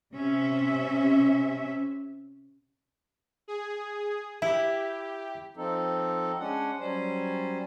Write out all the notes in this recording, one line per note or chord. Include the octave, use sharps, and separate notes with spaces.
C3 C#4 E5
G#4
E4 G4 E5
F3 C4 D#4 A4
G#3 C#4 D4 F#5
F#3 G3 C#4 C5